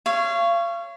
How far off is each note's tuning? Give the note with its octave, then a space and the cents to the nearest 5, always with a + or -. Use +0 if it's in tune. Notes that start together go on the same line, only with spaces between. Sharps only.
C#5 +0 F5 -35